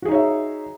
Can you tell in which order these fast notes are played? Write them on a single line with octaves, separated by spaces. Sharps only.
F#4 G#4 D#4 C#5 E5